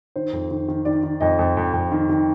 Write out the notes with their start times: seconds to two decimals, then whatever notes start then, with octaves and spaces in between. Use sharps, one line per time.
0.16 D#3 C5
0.33 F2
0.51 D#3
0.68 D#3
0.85 D#3 D5
1.03 D#3
1.21 F2 D#5
1.39 F2
1.57 F2
1.73 F2
1.92 D#3
2.09 D#3